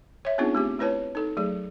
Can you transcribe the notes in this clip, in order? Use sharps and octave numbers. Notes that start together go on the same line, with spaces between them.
C#5 E5
B3 C4 D4 D#4 F4 G#4
A3 C4 G4
A3 E4 B4 C#5 A5
D#4 A4
F#3 A3 G#4